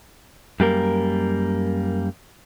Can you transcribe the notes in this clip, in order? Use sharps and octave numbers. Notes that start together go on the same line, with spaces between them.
F#2 G3 A#3 A#4